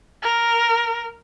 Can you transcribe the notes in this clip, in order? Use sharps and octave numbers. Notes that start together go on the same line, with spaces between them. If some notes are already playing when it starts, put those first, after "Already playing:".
A#4